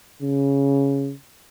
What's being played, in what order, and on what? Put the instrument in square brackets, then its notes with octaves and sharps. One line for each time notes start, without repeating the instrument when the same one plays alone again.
[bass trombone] C#3